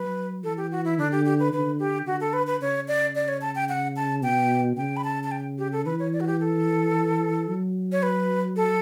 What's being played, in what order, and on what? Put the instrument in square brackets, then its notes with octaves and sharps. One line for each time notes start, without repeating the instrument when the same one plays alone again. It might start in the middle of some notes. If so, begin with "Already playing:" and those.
Already playing: [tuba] F#3 [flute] B4
[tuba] E3 [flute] A4
[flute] G4
F#4
E4
[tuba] D3 [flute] D4
[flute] G4
G4
B4
[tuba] D3 [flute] B4
[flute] G4
[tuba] D3 [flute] F#4
[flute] A4
B4
B4
[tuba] C#3 [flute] C#5
[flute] D5
D5
C#5
A5
G5
F#5
A5
[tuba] B2 [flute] G5
[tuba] C#3 [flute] G5
[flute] B5
A5
A5
G5
G4
A4
[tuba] E3 [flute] B4
[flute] C#5
D5
F#4
G4
A4
[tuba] F#3
[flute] C#5
B4
A4